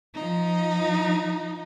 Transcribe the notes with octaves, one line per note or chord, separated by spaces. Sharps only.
F3 D#4